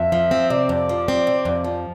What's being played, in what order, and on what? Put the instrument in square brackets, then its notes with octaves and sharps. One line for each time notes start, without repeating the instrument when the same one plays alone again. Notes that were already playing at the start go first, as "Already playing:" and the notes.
Already playing: [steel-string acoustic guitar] F2 [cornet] E5
[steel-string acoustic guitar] F3
C4
[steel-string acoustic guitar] C3 [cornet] D5
[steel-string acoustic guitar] F2
F3
C4
C3
F2
F3